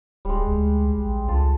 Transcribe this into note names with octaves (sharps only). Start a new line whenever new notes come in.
D1 G3 G#3
D2
A#1
C#2 F4 A4